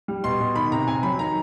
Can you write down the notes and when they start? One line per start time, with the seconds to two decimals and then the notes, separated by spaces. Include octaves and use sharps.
0.08 G3
0.24 B2 C6
0.40 B2
0.55 D#3 B5
0.72 C3 A#5
0.88 C3 G#5
1.03 F#3 B5
1.19 D#3 A#5